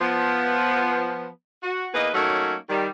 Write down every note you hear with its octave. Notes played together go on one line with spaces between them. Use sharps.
F3 B3
F#4
E2 A#3 A#4 B4 D#5
F#3 A3 A#3 C#4 D#4 F#4
D#3 G3